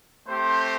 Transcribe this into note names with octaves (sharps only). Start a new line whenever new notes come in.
A3 C4 G4 C5